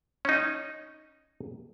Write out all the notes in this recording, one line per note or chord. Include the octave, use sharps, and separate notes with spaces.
C#4 D#4